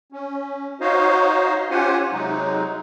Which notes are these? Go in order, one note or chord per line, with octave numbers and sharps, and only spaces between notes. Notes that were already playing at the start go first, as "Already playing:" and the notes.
C#4
D#4 F#4 C5 C#5 D#5 F5
C#4 F4 G4 C5 F#5 G#5
C3 F#3 G#3 D#4